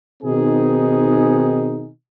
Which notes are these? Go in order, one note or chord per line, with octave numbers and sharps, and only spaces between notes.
B2 D#3 C4 D#4 G#4